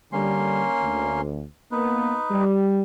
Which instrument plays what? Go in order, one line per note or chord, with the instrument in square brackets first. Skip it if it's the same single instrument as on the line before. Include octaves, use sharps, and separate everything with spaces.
[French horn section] D3 G3 [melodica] A#3 C#4 C6
[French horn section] D2
[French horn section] A#3 B3 [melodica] D#4 B4
[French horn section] G3